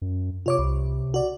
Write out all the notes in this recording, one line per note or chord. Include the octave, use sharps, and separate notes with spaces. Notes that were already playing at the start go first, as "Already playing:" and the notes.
F#2
C3 F4 C#5 D6
C2
F#4 D5